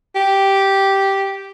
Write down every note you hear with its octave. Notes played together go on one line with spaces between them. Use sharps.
G4